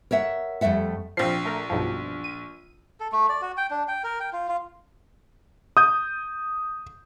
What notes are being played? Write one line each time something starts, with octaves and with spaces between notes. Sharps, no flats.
A#4 C#5 E5 F#5
F2 G3 A3 E5 F#5
A#1 F3 C4 C7
A3 A#4 F6
B1 G2 F3
D#7
A4
A3
D5
F#4
G5
D4
G5
A#4
G5
F4
F4
D#6 G6